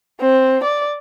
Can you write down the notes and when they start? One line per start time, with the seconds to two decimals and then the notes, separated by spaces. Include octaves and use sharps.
0.21 C4
0.64 D5